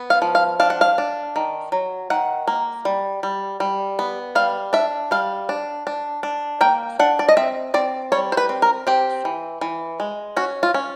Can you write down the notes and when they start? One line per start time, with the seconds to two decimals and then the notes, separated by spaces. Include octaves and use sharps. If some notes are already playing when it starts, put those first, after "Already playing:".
Already playing: B3
0.10 F5
0.22 F3
0.35 F5
0.60 D4 F5
0.70 F#5
0.81 F5
0.98 D4
1.36 D#3
1.72 F#3
2.10 D#3 F#5
2.48 A#3
2.85 G3
3.23 G3
3.60 G3
3.99 B3
4.35 G3 F5
4.73 D4 E5
5.11 G3 F5
5.49 D4
5.87 D4
6.23 D4
6.61 A#3 G5
6.99 D4 F#5
7.19 D5
7.29 D#5
7.37 C4 E5
7.74 C4 D5
8.12 G3 C#5
8.32 C5
8.37 B4
8.49 C4
8.62 A#4
8.87 C4 G4
9.25 E3
9.61 E3
10.00 G#3
10.37 C#4 F#4
10.63 F4
10.74 C#4